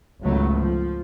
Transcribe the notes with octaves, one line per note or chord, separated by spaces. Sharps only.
G#1 C#2 F#3 A3 B3
F3